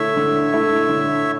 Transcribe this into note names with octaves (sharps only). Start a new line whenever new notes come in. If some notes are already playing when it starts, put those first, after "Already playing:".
Already playing: D3 A3 E4 C#5 E5
D3
A3 E4
D3